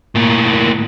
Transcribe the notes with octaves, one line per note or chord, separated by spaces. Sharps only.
A2 A#3